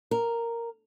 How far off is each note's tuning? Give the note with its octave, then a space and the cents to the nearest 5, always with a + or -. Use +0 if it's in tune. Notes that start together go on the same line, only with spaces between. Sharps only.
A#4 -5